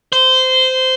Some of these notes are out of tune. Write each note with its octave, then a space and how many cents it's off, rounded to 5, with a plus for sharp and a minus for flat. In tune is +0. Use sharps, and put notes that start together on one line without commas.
C5 -15